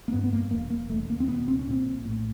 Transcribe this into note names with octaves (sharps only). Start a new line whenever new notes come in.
A#3
G2 B3
B3
G2 A#3
E1 A#3
E1 A#3
E1 A3
D#2 A#3
C4
B2 B3
C#2 C4
C#4
A#2 C4
A#1
A2